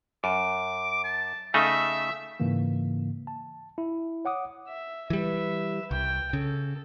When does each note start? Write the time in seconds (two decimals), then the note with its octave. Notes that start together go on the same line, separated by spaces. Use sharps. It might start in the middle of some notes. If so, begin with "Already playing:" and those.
0.24 F#2 D6
1.04 A5
1.54 C#3 A3 D#4 E5
2.40 G#2 C#3 E3 A#3
3.27 A5
3.78 E4
4.25 C#5 F#5 D6 D#6
4.68 E5
5.10 E3 G3 B4 E5
5.91 C2 G5
6.33 C#3 A4